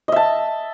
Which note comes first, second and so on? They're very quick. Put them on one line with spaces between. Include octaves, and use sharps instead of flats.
D#5 E5 A5